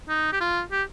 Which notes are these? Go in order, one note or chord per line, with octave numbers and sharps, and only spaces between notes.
D#4
G4
F4
G4